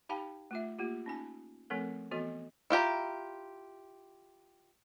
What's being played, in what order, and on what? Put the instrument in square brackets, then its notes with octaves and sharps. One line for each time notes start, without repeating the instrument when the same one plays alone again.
[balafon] D#4 G4 F5 G5 A5 B5
A3 F4 E5
A#3 F4 G4
C#4 D#4 G#5
F3 A3 C4 A4 A#4
E3 B3 F#4 A4 D#5
[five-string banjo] E4 F4 G4 A#5